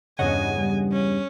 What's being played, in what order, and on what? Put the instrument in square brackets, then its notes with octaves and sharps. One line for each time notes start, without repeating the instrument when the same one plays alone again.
[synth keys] E2 G2 C#3 [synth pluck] C#5 D#5 F#5 [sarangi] G#5
[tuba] G3
[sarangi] C#4